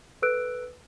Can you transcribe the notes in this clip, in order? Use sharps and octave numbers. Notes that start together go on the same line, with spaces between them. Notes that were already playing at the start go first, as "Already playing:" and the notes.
A4 B4 E6 F#6 D7